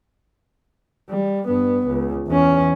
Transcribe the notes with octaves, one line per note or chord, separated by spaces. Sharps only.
G3
G2 B3
C#2
E2 C#4